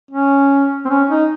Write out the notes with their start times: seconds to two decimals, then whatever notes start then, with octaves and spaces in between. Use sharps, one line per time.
0.11 C#4
0.85 C4
0.89 C#4
1.10 D#4